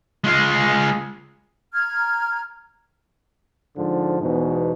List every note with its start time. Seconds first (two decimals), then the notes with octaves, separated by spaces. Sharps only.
0.24 G#3 F4
1.73 A#5 F6 G#6
3.76 G#2 D3 F3
4.20 E2 G#2 B2